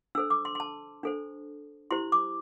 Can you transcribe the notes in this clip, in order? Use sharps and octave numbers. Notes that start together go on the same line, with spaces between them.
D4 A4 C5 E6
D6
C6
C6
A5
D4 A4 C5
E4 G4 C5 C6
D6